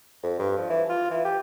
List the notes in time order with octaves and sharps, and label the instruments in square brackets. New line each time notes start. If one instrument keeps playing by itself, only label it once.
[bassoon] F2
G2
F3
E3
F4
E3
G4